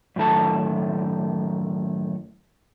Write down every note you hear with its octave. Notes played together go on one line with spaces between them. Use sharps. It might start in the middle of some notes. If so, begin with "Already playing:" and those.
F#2 A2 D#3 A4 A5